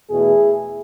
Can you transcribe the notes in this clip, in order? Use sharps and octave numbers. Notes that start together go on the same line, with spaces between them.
E2 B2 A3 E4 G#4